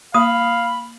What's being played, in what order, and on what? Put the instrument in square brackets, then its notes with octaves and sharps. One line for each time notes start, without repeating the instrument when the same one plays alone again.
[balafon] A#3 [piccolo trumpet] F5 [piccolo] B5 [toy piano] D#6